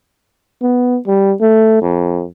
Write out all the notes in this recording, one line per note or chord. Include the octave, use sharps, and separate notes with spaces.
B3
G3
A3
F2